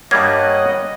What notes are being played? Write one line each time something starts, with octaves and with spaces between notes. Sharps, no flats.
G2 G3 A#3 C#5 D#5 F#5 G#6